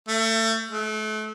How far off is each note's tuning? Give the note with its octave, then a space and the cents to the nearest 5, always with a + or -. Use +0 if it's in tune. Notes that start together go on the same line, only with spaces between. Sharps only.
A3 +30
A3 -35